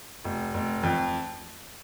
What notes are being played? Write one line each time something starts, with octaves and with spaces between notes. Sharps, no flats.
F1
F1
F2